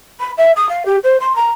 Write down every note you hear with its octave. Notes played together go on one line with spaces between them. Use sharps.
B5
E5
D#6
F5
G4
C5
C6
A#5